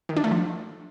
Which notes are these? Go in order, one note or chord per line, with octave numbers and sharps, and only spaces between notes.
D#3
D4
A3
F3